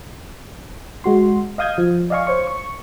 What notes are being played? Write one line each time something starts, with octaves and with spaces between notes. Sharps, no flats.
G#3 F#4 C6
D#5 F5 D#6 G6 G#6
F3
D5 D#5 F5 G#5 C#6
C5 C#5 C#6
C#6